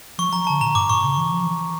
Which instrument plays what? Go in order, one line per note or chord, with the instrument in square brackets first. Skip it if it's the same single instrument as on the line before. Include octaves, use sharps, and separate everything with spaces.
[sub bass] F3 [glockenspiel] C#6
[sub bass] F3 [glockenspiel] A#5
[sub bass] D3 [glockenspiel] A5
[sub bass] A#2 [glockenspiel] A#5
[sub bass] G2 [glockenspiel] D6
[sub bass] A#2 [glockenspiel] C#6
[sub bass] C#3
E3
F3
E3